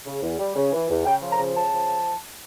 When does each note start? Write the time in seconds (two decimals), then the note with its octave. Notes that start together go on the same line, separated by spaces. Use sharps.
0.06 C#3
0.22 E2
0.39 G3
0.56 C#3
0.73 E3
0.90 E2
1.06 C#3 G5
1.22 F3
1.31 A#5
1.39 C#3
1.56 C#3 A5
1.73 F3